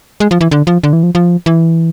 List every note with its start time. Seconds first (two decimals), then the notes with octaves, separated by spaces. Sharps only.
0.20 G#3
0.31 F3
0.41 E3
0.51 D3
0.67 F3
0.83 D3
0.93 E3
1.03 F3
1.15 F3
1.46 E3